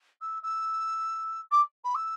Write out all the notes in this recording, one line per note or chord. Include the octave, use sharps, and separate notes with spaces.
E6
E6
D6
B5
E6